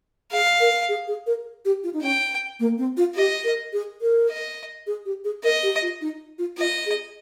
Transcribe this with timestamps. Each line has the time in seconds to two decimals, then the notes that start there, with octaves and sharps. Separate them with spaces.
0.32 G#4 F5
0.60 A#4
0.89 G#4
1.08 G#4
1.26 A#4
1.65 G4
1.84 F4
1.93 D#4
2.02 C#4 G5
2.60 A#3
2.78 C4
2.97 F4
3.16 G4 D#5
3.44 A#4
3.73 G#4
4.01 A#4
4.30 D#5
4.87 G#4
5.05 G4
5.24 G#4
5.44 A#4 D#5
5.63 G4
5.82 F4
6.01 D#4
6.38 F4
6.58 F4 D#5
6.86 G#4